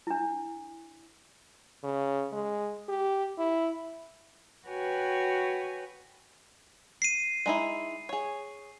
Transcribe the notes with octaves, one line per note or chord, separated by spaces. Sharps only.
D4 E4
C#3
G#3
G4
E4
F#4 B4 C#5 G5 G#5
C7 D#7
G#3 D#4 E4
G#4 C#5